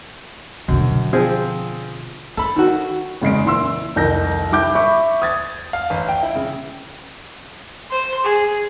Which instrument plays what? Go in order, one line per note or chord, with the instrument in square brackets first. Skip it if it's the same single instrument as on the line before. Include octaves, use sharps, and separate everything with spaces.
[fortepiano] F#2 [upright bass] B2 D3
[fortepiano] F3 C4 G#4
[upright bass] C#4 [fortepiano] A4 B5
[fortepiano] D#3 F#4
[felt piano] E2 C#3 G#3 C7 D7
A#2 E3 C6 E6
C2 F2 D#3 G6 A#6
G3 E4 D6 G6
E5 B5 C#6 D6
D#6 G#6 A6
[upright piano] F5
A1
G5
E4
C#3
[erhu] C5
G#4